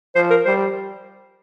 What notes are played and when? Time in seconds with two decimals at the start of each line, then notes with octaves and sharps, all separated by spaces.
0.15 F3 C5
0.30 A#4
0.45 G3 C5